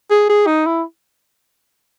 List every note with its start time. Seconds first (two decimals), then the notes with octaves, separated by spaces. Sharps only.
0.10 G#4
0.29 G#4
0.46 D#4
0.66 E4